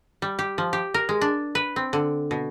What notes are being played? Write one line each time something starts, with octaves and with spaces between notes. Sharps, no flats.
G3
G4
F3
G4
A#4
G#3
D4
B4
C4
D3
B2